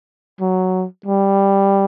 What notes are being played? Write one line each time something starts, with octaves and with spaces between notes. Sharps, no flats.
F#3
G3